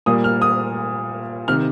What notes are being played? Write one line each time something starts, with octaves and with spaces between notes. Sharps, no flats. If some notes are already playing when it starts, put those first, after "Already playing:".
A#2 G3 A#3 D#6
F6
D#6
C3 D#3 F6